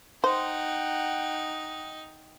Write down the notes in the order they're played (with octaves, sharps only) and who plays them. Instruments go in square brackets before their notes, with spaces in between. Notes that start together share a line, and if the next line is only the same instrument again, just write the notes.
[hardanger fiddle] D#4 [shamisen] C5 [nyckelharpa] F#5 G5